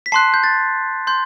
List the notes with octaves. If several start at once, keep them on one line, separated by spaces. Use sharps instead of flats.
B6
A5 C6 F#6 C7
G6
A6
C6 G6